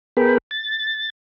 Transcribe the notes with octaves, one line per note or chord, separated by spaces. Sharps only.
B3 G#4 A#4 G5 B5
A6